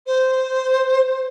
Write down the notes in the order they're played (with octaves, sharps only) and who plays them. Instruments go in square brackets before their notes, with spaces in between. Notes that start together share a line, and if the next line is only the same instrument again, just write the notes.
[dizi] C5